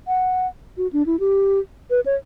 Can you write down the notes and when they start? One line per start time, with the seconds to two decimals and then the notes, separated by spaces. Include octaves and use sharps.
0.08 F#5
0.77 F#4
0.93 D4
1.06 E4
1.20 G4
1.90 B4
2.06 C#5